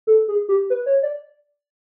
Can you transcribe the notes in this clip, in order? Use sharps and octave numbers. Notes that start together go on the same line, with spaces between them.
A4
G#4
G4
B4
C#5
D5